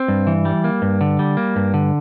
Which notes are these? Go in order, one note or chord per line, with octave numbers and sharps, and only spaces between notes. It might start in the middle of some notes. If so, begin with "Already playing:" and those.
Already playing: C4
G2
E3
G3
A#3
G2
D3
G3
A#3
G2
D3